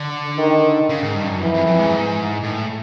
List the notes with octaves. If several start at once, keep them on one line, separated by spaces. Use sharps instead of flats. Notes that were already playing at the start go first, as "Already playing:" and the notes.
Already playing: D3
D#3
C#3
G#2
G2
F#2
F2 E3
F2
F2
G#2
A2